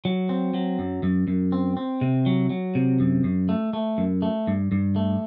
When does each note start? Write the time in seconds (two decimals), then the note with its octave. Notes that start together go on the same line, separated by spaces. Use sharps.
0.05 F#3
0.29 C4
0.54 F#3
0.79 F#2
1.03 F#2
1.28 F#2
1.52 C4
1.77 C4
2.01 C3
2.26 F#3
2.50 F#3
2.75 C3
3.00 F#2
3.24 F#2
3.49 A3
3.73 A3
3.98 F#2
4.22 A3
4.47 G2
4.72 G2
4.96 A3